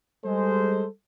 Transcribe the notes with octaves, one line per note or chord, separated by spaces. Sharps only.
G3 G#3 A4 C5